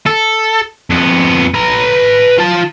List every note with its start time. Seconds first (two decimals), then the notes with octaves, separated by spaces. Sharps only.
0.06 A4
0.90 F2 B3
1.54 B4 A#5
2.38 F4 A5